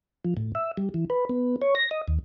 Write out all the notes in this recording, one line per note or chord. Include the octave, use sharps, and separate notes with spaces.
F3
A2
E5
G3
E3
B4
B3
C#5
A#6
D#5
D#2